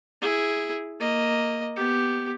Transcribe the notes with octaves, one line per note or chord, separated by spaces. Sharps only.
E4 G#4
A#3 D#5
B3 G4